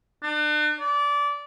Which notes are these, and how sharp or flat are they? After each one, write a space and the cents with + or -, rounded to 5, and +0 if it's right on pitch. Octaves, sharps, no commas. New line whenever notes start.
D4 +40
D5 -25